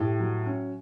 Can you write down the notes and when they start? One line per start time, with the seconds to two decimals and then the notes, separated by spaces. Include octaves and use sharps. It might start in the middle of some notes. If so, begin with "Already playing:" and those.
Already playing: A2 G4
0.20 F#3
0.46 C#4